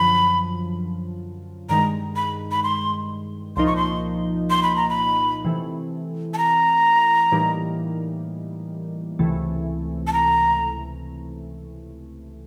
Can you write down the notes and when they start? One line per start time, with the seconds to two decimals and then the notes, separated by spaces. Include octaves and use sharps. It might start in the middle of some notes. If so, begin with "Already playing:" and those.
Already playing: F#2 D3 F3 B5
1.69 G2 D#3 G#3 A#5
2.16 B5
2.51 B5
2.64 C6
3.57 C2 A#2 F3 A#3 D#4 C6
3.67 C#6
3.76 C6
4.50 C6
4.63 B5
4.76 A#5
4.90 B5
5.45 C3 E3 A3
6.34 A5
6.38 A#5
7.32 A2 E3 G3 A#3 D#4
9.19 C#2 C3 E3 A3
10.07 A5
10.13 A#5